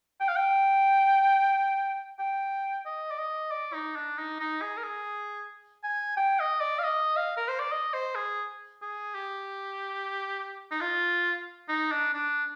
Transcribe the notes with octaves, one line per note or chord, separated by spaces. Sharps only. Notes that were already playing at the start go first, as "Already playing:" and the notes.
G5
F5
G5
G5
D#5
D5
D#5
D5
D#4
D4
D#4
D#4
G#4
A#4
G#4
G#5
G5
D#5
D5
F5
D#5
F5
A#4
C5
D5
D#5
C5
G#4
G#4
G4
D#4
F4
D#4
D4
D4